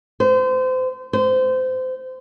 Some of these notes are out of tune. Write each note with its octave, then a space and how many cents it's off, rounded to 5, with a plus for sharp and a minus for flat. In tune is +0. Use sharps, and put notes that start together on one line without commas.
C5 -30
C5 -25